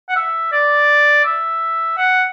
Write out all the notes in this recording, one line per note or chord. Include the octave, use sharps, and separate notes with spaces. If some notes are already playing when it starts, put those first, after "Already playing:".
F#5
E5
D5
E5
F#5